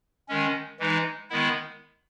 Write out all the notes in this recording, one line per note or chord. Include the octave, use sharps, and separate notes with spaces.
D#3 G#3 C#4
E3 G#3 D#4
D#3 G#3 B3 E4